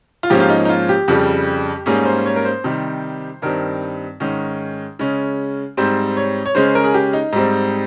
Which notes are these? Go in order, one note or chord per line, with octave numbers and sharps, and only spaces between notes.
F4
G#2 F3 A#3 C#4 G4
F4
D#4
D#4
F4
G4
F2 C#3 G3
G#2 G3 A#3 C#4 G#4
C5
C#5
A#4
C5
C3 D#3 G3
G2 D#3 G3 C4 A#4
G#2 D#3 G#3 C#4
C#3 G#3 C#4
G#2 G3 C4 C5
C#5
C#5
C#3 G#3 C#4 C5
A#4
G#4
G4
D#4
G#2 G3 C4